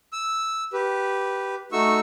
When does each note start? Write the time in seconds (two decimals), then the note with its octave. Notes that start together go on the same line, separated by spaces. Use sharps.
0.13 E6
0.73 G4 B4
1.72 A3 D#4 F#4 C#6 E6